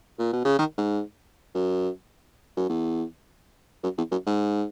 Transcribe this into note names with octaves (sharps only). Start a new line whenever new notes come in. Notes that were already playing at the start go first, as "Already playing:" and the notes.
A#2
B2
C#3
D#3
G#2
F#2
F#2
E2
F#2
E2
F#2
G#2